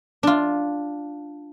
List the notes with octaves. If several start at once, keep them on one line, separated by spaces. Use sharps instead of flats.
D4 F4